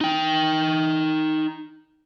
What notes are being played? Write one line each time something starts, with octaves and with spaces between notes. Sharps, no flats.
D#4 G5